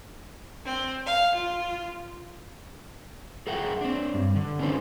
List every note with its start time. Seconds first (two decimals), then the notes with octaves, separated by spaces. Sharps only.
0.65 C4
1.06 F5
1.35 F4
3.47 G#4 A#4 E5 F#5 G5
3.81 C4 D4
4.14 G2
4.36 D3
4.59 B3 C#4 D#4 G#4 B4 C5